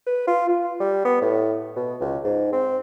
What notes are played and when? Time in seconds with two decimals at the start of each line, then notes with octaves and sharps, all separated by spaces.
0.06 B4
0.27 F4
0.49 F4
0.80 G3
1.05 B3
1.21 A2
1.76 B2
2.01 C#2
2.24 G#2
2.53 C4